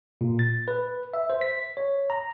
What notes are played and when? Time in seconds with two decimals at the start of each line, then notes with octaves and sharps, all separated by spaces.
0.21 A#2
0.39 A6
0.68 B4
1.14 E5
1.30 C5
1.41 B6
1.77 C#5
2.10 A#5